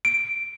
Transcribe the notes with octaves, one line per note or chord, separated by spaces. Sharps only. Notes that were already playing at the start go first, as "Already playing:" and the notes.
D7